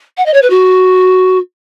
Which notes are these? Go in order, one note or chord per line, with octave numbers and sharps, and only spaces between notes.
F#5
D#5
C#5
B4
F#4